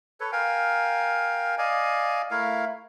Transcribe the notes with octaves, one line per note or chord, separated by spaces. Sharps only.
A4 B4 C#5
A#4 F5 G5 G#5
D5 D#5 F5 G#5
A3 E4 A#4 F5